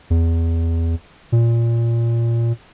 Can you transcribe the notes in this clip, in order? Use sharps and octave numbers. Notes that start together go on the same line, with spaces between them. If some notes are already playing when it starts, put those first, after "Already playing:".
E2
A#2